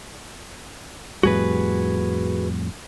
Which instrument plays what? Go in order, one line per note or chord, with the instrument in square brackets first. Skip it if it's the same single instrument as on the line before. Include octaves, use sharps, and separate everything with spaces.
[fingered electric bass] F2 A2 G3 [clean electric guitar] F#4 G#4 B4